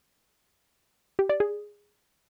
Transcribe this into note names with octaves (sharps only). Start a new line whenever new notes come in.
G4
D5
G#4